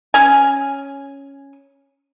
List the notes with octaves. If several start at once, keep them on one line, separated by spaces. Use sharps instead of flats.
C#4 G#5